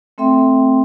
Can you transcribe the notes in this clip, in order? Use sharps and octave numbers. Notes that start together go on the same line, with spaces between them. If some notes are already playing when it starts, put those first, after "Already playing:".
A3 C4 A4 E5 G5 C6